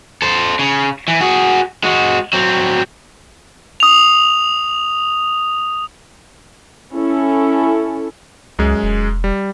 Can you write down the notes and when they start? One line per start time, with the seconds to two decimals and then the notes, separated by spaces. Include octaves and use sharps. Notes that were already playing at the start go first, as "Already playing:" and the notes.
0.22 A4 C5
0.59 C#3
1.08 E3
1.21 F#4 G#4
1.84 G#3 F#4
2.33 F#3 C4
3.80 D#6 F7
6.93 C#4 E4 A4
8.59 C#2 F#2 G#3
8.83 E1
9.24 G3